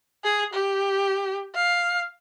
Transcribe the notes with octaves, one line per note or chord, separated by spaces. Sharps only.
G#4
G4
F5